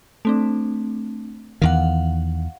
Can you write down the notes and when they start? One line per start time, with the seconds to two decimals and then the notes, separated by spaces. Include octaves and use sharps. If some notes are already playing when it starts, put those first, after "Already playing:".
0.25 A3 C4 D4
1.62 E2 D#3 F5 F#5